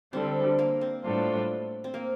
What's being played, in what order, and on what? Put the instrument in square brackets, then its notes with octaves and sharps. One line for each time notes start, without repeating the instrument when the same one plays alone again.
[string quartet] D3 G3 D4 A4 [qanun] C4
[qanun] A#3
C4
[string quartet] A2 G3 D4 F4 A4
[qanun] C4
A#3